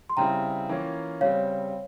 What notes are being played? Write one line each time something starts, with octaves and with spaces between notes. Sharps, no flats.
C6
C#3 G3 C4 E4 G5 A#5
E3 A#3 C#4 F4
C#3 G3 C4 C#5 F5